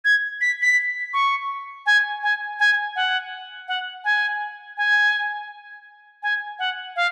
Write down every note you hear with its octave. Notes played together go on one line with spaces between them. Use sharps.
G#6
B6
B6
C#6
G#5
G#5
G#5
F#5
F#5
G#5
G#5
G#5
F#5
F5